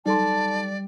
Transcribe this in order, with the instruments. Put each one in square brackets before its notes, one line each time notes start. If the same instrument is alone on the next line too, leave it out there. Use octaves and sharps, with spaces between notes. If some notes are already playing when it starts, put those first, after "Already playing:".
[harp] G3 [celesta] D#4 A4 C6 [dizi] D5 [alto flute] A5